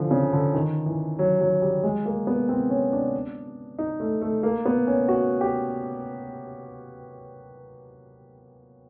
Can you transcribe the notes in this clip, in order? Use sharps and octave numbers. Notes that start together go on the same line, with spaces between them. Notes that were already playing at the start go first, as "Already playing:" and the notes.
Already playing: D3 E3 F3
C#3
D3
D#3
E3
F#3
F#3
G3
G#3
A#3
B3
C4
C#4
D4
D#4
A3
A3
A#3
B3
C#4
F#4
G4